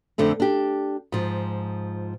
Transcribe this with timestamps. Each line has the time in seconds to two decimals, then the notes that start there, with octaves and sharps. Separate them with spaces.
0.18 F2 D3 A3 C4
0.40 D4 G4
1.12 G#2 F3